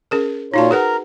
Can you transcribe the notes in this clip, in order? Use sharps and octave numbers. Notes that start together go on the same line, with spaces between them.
C#4 G#4 A#4
A#2 D#4 F4 F#4 C#5 A5
G#4 A#4 B4 F#5 A#5